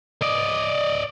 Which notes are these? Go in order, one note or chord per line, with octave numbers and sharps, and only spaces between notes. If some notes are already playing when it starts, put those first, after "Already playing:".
D5 D#5